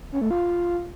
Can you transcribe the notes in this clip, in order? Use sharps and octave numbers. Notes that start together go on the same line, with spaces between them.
C#4
A3
F4